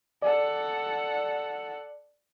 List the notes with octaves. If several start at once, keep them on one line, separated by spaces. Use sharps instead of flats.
A4 D5 F#5